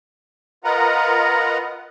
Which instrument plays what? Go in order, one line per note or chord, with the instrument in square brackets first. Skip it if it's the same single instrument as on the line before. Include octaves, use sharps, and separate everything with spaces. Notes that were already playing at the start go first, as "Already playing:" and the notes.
[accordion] F4 A#4 B4 D#5 F#5 A#5